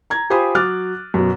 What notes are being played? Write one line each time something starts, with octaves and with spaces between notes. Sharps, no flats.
A#5 G#6
F4 G4 C5 G#5 B5 D#6
F#3 D6 F6 F#6 A6
F#2 B2